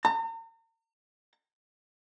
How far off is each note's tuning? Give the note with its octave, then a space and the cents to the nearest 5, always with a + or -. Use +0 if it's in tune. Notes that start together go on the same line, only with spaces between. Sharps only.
A#5 -40